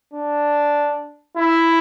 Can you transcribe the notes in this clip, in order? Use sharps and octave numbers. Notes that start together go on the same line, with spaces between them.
D4
E4